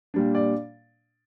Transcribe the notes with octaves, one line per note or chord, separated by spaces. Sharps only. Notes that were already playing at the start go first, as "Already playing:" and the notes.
A#2 G3 D4
D5